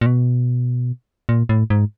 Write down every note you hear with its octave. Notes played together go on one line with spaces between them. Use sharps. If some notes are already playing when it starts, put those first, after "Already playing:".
A#2
B2
A#2
A2
G#2